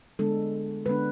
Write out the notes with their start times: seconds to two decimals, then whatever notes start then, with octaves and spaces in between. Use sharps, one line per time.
0.19 D3 G#3 B3 D4 A4
0.86 D3 G#3 B3 D4 B4